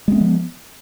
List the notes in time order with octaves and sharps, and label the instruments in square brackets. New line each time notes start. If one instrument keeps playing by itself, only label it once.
[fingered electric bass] G#3
C4
B3
F3